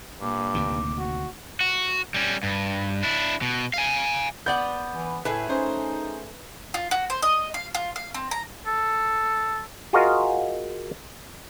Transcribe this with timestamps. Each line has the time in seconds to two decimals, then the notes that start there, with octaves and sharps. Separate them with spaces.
0.21 G2 A#2 D6
0.55 D2 C3 D#3
0.98 F#4
1.61 F#4
2.14 G3 C#4
2.43 G2
3.03 D4 E4
3.42 B2
3.74 F5 G#5
4.46 B3 D5 F#5 G6
4.94 E3
5.25 A2 A3 G#4 B4 E5
5.49 C#4 D#4 C5
6.74 F4
6.91 F#4
7.10 C5
7.22 D#5
7.54 F5
7.75 F4
7.96 F5
8.14 C4
8.31 A#5
8.66 A4
9.93 F4 F#4 G#4 A#4 D#5 F5